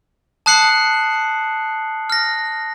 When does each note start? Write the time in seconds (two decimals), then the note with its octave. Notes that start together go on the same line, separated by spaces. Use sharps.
0.46 A5 D#6 F#6 C7 C#7 F#7
2.10 F6 A#6